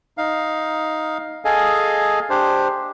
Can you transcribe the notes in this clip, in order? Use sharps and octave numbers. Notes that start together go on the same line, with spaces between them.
D#4 F5
G#4 A4 D#5 F5 G#5
D4 G4 C5